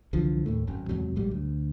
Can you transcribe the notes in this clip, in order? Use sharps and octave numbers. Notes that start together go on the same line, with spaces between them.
C2 D3 E3 F3
D#2 A2 A3
G#1 F#2
E2 G#2 C3 F#3
A#1 G#2 F#3 G3
D2